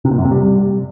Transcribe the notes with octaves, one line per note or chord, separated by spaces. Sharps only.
C3
A#2
F#2
C3
G3